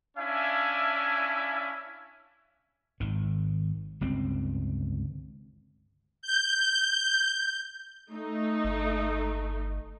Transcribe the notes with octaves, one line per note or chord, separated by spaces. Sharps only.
C#4 D4 E4 E5 F5 G#5
G#1 D#3
G1 C#2 C4
G6
A3 D#4
G1